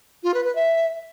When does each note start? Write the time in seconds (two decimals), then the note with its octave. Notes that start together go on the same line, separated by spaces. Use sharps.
0.24 F4
0.34 B4
0.45 B4
0.55 E5